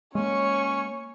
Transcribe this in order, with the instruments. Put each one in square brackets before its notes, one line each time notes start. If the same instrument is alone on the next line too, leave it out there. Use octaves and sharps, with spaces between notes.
[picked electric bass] G#3 A#3 [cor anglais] C#4 [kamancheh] C#5 C#6